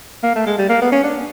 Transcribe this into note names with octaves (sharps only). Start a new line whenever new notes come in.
A#3
A3
G#3
G3
A#3
B3
C#4
D4